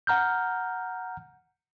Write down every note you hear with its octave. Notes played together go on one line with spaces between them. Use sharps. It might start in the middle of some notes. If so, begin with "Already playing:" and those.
F#5 A#5 F6 G6